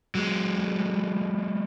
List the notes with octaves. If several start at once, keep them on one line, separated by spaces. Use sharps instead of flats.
F#3 G#3